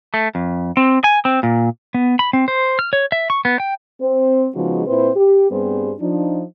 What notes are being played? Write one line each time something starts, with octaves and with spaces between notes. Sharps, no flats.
A3
F2
C4
G#5
C4
A#2
B3
B5
C4
C5
F6
C#5
E5
C#6
B3
G5
C4 C5
C#3 F3 G#3 B3 D#4 F#4
A#2 C4 E4 B4 C5
G4
G2 G3 B3 C4 G#4 C5
F3 D4 D#4